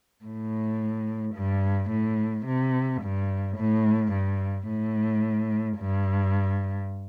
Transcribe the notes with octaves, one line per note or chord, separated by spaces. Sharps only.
A2
G2
A2
C3
G2
A2
G2
A2
G2